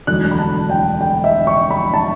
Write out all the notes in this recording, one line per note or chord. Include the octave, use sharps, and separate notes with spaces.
E1 D2 D3 F#3 A3 F#6
B5
A5
G5
G5
E5
C#6
B5
A5